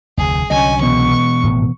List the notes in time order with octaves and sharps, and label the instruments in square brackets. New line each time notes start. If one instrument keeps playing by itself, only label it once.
[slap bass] F1 D2 [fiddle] G#4
[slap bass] C2 D3 F#3 [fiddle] C#4 G#5 [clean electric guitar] D#5
[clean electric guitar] E2 B2 [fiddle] C#6
[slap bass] G#1 A2 B3